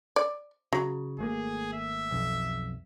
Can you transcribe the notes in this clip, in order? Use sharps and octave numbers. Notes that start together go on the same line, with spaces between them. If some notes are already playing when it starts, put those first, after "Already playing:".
D5
C#3 F#3
G#1 A3 A#3 G#4
E5
B1 F2